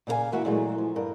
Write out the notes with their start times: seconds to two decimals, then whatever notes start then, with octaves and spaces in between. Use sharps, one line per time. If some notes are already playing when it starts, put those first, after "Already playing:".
0.07 A#2 C#3 A#4 F5 G#5
0.32 E3 A#3 F#4 E5
0.45 A#2 E3 F#3 G#3 A3
0.78 F3
0.96 G2 A#4